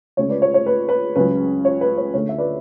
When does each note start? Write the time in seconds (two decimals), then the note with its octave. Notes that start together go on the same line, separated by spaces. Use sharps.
0.17 D2 C#3 G#3 C#4 C#5
0.30 B4 D5
0.42 C#5
0.54 C#5
0.66 B4
0.89 B4
1.16 C#2 C#3 F#3 C#4 B4
1.65 C#5
1.81 B4
1.97 C#5
2.14 D2 D3 A3 C#5
2.29 E5
2.38 B4 D5